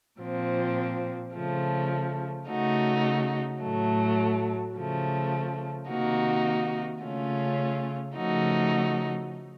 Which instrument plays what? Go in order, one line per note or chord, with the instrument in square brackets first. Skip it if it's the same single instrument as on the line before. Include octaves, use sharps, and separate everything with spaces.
[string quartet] A#2 F3 C4
C#3 F3 A3
C#3 A3 D#4 F#4
A2 F#3 A3
C#3 F3 A3
C3 D#3 A#3 D#4 F#4
C#3 A3 C#4 F4
C#3 F3 A3 D#4 F#4